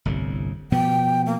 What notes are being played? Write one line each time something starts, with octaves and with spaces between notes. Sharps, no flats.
G1 C2 A2
B2 F3 B3 G5
A#3